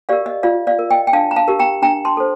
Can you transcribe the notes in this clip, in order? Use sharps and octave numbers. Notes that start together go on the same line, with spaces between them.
G4 A#4 D5 F5
D#5
F4 D5 F5
D5 F5
A#4
D#5 G5
G5
D4 F5 A5
A#5
F5 A5
G4 A#4
G5 A#5
D4 G5 A#5
A5 C6
A4 C5